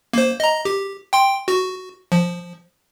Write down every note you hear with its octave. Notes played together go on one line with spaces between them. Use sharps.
A#3 C5
D#5 A#5
G4
G5 C6
F#4
F3